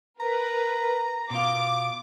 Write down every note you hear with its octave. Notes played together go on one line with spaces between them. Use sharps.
A#4 B4 A#5
B2 F4 D6